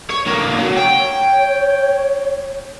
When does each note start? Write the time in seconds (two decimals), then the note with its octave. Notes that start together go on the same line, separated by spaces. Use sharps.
0.10 C#5
0.26 D3 A#3
0.58 F#3
0.76 C#5 G5